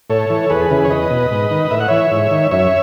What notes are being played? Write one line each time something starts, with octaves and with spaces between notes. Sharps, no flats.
A2 A4 C#5
E3
E2 G#4 B4
C#3 E3
C#5
E2 B4 D#5
B2
G#2
D#3
A2 E5
F#5
E3 C#5 E5
G#2
D#3
F#2 C#5 E5